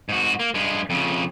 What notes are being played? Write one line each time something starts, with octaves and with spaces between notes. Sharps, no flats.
G#2 F#4
A#3
G2 G#3
F2 C#3